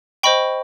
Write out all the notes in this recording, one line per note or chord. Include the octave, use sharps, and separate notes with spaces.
C5 D#5 G5 B5 C#6